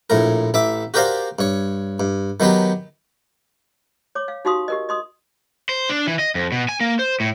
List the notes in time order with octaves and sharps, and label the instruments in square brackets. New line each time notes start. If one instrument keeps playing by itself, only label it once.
[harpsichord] A#1 A2 A#4
A1 E5 D6
F#4 G4 A#4 C5 D5 F5
G2 C#5
G2
D#3 F#3 B3 G4
[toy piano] C#5 D6
F5
D#4 F#4 G4 F5 C6 D#6
G4 A#4 D#5
D#5 C6 D#6
[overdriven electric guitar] C5
D4
E3
D#5
F2
B2
G#5
A#3
C5
A2